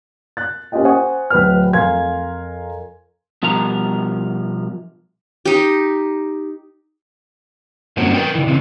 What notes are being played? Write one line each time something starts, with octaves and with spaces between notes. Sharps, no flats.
F#6 A6
A#3 C#4 F4 G4 D#5 G5
C5 F#5 G#5 C#6 D#6
D1 B4 F6
F2 A#4 F5 G#5 C6 G#6
B2 F3 G3 A#4 A#5
D#4 G4
G2 A#3 C4 C#4 F#4
A#4 B4 G5
C#3 E3
C#3 E3 C4